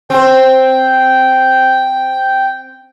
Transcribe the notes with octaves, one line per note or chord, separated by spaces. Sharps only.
C4 C5 G5